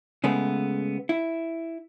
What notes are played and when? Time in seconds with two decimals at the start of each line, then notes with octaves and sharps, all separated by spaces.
0.24 C#3 G#3 A3 B3
1.09 E4